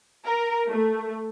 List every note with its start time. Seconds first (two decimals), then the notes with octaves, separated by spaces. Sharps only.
0.25 A#4
0.69 A3